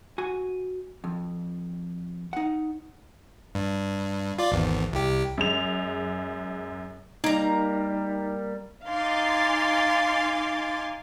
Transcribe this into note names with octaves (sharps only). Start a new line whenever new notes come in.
F#4 G#5
F2
D#4 F#5
G2
F4 D5
G#1 E2
C2 G4
F#2 G#3 F7
G3 A#3 D#4 A#5
D#4 F5 G#5 C6 D6 A6